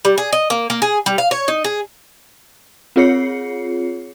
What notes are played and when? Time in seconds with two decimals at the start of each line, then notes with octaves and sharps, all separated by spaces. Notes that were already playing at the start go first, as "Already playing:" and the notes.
0.05 G3
0.18 G#4
0.33 D#5
0.50 A#3
0.70 A#3
0.82 G#4
1.06 G3
1.18 F5
1.31 C#5
1.48 D#4
1.64 G#4
2.96 C4 F4 G#4 C#5 C7 C#7